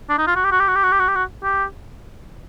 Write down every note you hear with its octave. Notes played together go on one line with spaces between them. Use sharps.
D4
D#4
F4
F#4
G4
F#4
G4
F#4
G4
F#4
G4
F#4
G4
F#4
G4